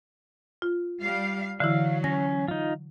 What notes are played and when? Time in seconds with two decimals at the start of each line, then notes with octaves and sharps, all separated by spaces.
0.62 F4
1.02 G3 F5
1.60 D3 E3 F#3 E4 F5
2.04 C#4 A#6
2.48 D#4 F4